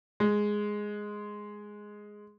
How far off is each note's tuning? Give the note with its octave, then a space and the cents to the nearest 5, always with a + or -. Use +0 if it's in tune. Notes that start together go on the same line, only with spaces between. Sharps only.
G#3 +0